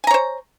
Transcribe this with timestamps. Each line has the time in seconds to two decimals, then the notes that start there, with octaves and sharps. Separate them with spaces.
0.04 G#5
0.07 A#5
0.11 C#5
0.14 C5